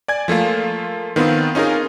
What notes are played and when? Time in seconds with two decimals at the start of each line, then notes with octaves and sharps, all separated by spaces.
0.08 D5 G#5 G#6
0.28 F3 A3 A#3 F4
1.16 D#3 B3 C4 F4
1.55 C#4 D#4 F4 G#4 A#4